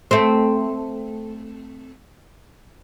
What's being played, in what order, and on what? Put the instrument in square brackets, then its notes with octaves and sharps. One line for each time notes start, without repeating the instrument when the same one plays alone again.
[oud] A3 C4